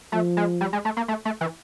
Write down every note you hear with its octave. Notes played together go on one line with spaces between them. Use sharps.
F3 A3
G#3
G3
G#3
A3
A#3
A3
A3
E3